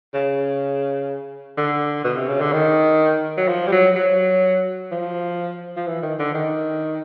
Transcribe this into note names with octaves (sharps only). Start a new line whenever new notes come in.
C#3
D3
B2
C3
C#3
D3
D#3
F#3
F3
G3
F#3
F#3
F3
F3
E3
D#3
D3
D#3